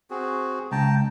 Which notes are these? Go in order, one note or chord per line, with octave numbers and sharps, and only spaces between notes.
C4 F#4 G#4
C#2 G5 A5 A#5